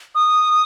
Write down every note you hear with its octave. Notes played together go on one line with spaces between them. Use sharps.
D#6